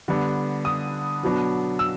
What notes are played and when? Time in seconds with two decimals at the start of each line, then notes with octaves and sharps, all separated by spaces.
0.08 D3 G3 B3 D4
0.65 D#6
1.23 B2 F#3 B3 D4
1.79 E6